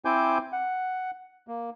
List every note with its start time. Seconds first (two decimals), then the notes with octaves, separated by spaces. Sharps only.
0.05 C4 E4 C5 G#5 D6 G6
0.53 F#5
1.48 A#3